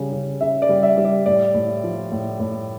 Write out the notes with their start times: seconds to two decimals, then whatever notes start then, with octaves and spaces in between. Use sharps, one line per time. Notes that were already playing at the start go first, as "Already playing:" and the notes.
Already playing: C#3 G3
0.12 C#3
0.41 C#3 E5
0.62 D5
0.69 G3
0.83 E5
0.98 G3
1.05 D5
1.26 A2 D5
1.54 A2
1.84 F3
2.12 A2
2.40 A2